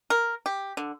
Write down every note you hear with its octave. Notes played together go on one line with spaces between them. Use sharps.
A#4
G4
D3